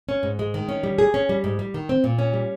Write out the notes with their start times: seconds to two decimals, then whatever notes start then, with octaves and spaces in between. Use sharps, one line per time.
0.09 C#4
0.23 G#2
0.39 G#3
0.54 D#3
0.69 C#4
0.83 G3
0.98 G#4
1.14 C#4
1.29 G3
1.44 G#2
1.59 G3
1.74 D#3
1.89 C4
2.04 A#2
2.19 C#4
2.33 G3